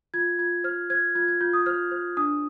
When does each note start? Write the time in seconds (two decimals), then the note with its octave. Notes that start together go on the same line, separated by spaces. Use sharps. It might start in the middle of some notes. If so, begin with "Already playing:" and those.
0.14 F4 G#6
0.39 F4 G#6
0.64 C5 F6
0.90 C5 G#6
1.15 F4 G#6
1.28 G#6
1.41 F4 G6
1.53 D#6
1.66 C5 F6
1.91 C5
2.17 D4 D#6